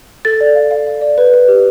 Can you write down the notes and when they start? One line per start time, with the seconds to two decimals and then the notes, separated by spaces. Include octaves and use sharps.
0.25 A4 A6
0.41 D5
0.55 F5
0.71 F5
0.86 F5
1.02 D5
1.18 B4
1.34 B4
1.48 G4